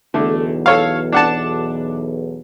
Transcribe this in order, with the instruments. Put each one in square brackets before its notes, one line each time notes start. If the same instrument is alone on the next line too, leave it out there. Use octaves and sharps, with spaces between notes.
[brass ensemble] B1 E2 [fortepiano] D3 A3
[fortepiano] A4 C#5 F5
D4 F#5 A5